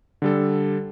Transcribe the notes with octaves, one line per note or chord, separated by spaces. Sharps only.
D3 G3 A4